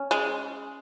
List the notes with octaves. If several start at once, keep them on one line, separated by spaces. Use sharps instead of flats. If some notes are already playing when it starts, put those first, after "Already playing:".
Already playing: C#4
G#3